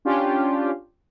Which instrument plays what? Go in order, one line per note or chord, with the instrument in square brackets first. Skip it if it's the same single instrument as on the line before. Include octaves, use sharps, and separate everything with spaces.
[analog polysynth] C#4 D4 F4 G4